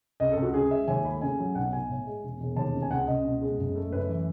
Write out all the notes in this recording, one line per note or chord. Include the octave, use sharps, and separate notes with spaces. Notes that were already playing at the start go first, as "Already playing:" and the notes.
C#2 D#5
A4
C#2
F#4
C#3 G#4
G#3 E5
D#2 G#5
A3 B5
C#3 G#5
F#3
B1 F#5
B1 G#5
A2
G#3
E1
E1
D#2 A5
C#3
G#5
C#2 F#5
C#2 D#5
B2
G#3
F#1
A3
F#2 B4
E3